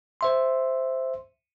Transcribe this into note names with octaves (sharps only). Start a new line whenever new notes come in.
C5 E5 C6